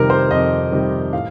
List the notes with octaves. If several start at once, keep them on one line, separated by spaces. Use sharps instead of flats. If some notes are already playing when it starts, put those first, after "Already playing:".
Already playing: F2 C3 D#3 G3 A#4
C5
F2 D#5
C3 D#3 G3
A2 F5